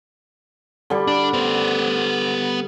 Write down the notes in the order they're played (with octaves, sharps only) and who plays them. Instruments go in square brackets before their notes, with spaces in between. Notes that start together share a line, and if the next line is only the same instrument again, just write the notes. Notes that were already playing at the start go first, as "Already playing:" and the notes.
[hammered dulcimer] D3 G3
[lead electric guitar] D4
B3 C5